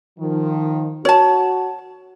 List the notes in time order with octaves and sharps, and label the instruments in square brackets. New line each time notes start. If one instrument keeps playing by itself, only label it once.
[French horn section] D#3 F3
[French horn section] F#4 [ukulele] C#5 A5